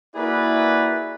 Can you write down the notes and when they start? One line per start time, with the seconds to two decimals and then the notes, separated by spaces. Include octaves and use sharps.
0.15 A#3 E4 F#4 G#4 B4 D5